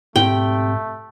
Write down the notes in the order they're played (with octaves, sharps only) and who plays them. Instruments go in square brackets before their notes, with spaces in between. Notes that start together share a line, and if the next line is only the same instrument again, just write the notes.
[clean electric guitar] B1 C4 G4 [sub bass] G#2 [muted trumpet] A3 [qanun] G5